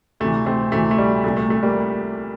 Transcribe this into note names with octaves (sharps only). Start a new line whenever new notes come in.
D2 C3 E3 A3
A3 C4
D2 C3 E3 A3
A3
G3
C2 A#2 A3
A3
A3
G3 A#3